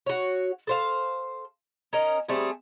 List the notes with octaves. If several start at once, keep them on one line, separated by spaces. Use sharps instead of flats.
F#4 C#5
A4 C5 F5
C#4 A#4 D#5
G3 A3 C4 G#4